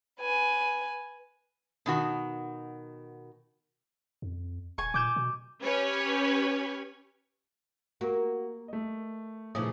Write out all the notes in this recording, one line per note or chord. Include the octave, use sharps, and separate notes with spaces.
B4 G#5
B2 D#3 F#4
F2
D#1 G#5 C#6
A#2 D6 G6 E7
B2
C#4 G4 B4 C#5 G#5
A#3 F#4 G4 A#4
A3 D#5
A#2 C#3 E3 F3 A3 D6 D#6